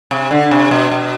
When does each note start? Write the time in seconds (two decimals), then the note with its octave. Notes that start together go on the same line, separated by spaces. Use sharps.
0.11 C3
0.31 D3
0.51 C3
0.71 B2
0.91 B2